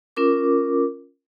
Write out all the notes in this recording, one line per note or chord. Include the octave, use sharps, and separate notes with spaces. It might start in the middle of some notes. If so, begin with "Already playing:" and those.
C#4 F4 A#4 D6